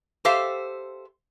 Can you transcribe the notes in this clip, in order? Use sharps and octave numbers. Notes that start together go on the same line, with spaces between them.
G4 A4 C5 E5 F5